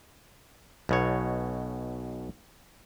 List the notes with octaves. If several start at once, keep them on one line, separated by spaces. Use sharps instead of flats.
B1 B2 C#5